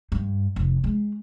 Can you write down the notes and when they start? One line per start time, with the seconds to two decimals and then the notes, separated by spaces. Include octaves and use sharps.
0.12 G2
0.56 F1
0.84 G#3